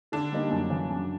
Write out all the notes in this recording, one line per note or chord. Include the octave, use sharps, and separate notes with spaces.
D3 D4
G3 A#3 D#4
F#2
C#3 E3
F#2